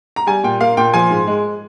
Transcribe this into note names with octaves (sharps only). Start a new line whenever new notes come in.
A#5
G3 G#5
A#2 G5
A#3 F5
A#2 G5
F3 G#5
G#2
G#3